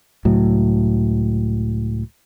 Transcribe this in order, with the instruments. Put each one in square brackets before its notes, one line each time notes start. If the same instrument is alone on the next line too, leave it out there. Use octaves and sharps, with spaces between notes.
[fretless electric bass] C#2 A2 F#3